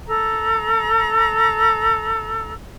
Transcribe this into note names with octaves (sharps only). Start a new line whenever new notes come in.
A4 A#5